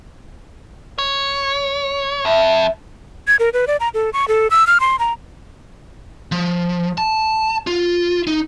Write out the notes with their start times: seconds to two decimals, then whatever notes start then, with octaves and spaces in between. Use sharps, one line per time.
0.99 C#5
2.25 F2 E5
3.27 G#6
3.39 A#4
3.53 B4
3.67 D5
3.80 A#5
3.94 A4
4.13 C#6
4.28 A4
4.51 E6
4.67 F6
4.80 C6
4.99 A#5
6.32 F3
6.98 A5
7.67 F4
8.27 D#4